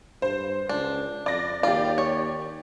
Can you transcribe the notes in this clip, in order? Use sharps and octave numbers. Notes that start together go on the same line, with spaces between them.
G2 C5
C#2 D4
F2 D5 A#6
D#2 F4 G4 D5
C#5